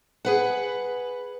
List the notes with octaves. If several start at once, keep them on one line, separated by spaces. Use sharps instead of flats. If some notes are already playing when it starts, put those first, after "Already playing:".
G#4 B4 F#5